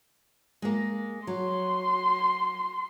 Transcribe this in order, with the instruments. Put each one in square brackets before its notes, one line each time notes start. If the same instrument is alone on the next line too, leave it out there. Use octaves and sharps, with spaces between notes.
[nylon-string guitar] G#3 A#3
[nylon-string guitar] F#3 [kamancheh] C6